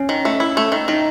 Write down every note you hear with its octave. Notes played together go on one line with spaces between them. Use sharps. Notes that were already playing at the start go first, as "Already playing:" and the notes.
Already playing: C#4
D#3
A3
E4
A3
D#3
D#3 D#4